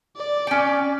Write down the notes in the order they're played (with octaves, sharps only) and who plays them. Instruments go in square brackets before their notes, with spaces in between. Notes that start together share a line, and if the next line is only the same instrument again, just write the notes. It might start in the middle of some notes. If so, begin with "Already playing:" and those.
[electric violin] D5
[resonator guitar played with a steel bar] C#4 G5